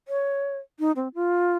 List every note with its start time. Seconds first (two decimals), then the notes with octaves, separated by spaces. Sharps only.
0.08 C#5
0.79 D#4
0.96 C4
1.15 F4